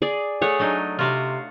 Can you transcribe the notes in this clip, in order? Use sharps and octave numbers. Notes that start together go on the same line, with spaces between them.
G#4 D5
A3 G#4 C#5 F#5
F#3 D4 D#4
C3 F4 F#4 F5